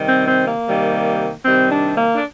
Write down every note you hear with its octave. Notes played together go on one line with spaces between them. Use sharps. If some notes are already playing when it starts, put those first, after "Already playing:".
Already playing: C3 D#3 G3
C4
C4
A#3
C3 D#3 G3
C3 D#3 G3 C4
D4
A#3
D4